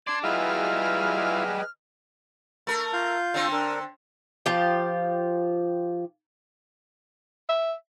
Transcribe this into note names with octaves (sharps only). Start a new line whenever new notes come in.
D4 D5 C6 G#6
F#3 G3 E4 F4 G#4 B4 D#5 F6
A3 A#4
F4 F5 G6
D3 C4
D4 A#4
F3 F4 G4
E5